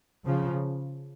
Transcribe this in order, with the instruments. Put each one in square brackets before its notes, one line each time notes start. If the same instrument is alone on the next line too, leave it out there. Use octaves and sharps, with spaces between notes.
[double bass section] C#3 F3